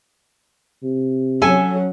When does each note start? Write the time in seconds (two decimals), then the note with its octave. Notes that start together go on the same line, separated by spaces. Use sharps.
0.83 C3
1.42 F#3 C#4 A4 E5 G#5